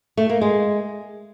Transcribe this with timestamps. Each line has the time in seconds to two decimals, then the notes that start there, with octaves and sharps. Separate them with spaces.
0.17 A3
0.29 A#3
0.41 G#3